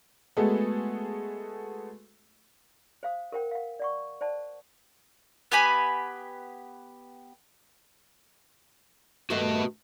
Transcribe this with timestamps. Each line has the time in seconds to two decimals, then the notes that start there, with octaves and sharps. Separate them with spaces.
0.37 G#3 A3 B3 F#4 G#4 A4
3.03 C5 F5 D#6
3.32 A#4 C5 F#5 G5
3.51 F5 F#5
3.80 D5 F#5 C#6
4.21 C5 D5 F#5 A5
5.52 B3 G4 G#5 B5
9.30 G2 D#3 A3 F#4 B4 D#5